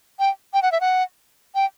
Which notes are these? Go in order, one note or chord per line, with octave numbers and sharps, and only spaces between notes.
G5
G5
F#5
E5
F#5
G5